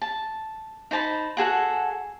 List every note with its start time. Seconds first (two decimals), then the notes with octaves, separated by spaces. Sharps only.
0.02 A5
0.91 D#4 C5 A5 B5
1.37 F#4 G#4 A4 F#5